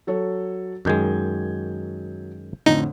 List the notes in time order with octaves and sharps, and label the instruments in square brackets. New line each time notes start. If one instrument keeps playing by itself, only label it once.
[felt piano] F#3 A4 C#5
[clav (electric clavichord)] F#2 D#3 G#3 [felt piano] F#3 G6 G#6
[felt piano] F2 A2 D3 [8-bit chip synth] D#4